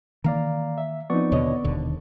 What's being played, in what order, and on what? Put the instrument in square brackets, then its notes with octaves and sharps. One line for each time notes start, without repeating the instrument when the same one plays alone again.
[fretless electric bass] D#3 E3 A#3 [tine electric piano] D5 F5 A#5
[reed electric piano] E5
[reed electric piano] F3 C4 D#4 [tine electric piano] B3 D5 C#6
[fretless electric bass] D#2 B2 D3 [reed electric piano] C#5 D#5
[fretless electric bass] D#1 D#2 D3 [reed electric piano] B2